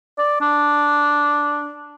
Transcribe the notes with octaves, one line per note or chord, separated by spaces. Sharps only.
D5
D4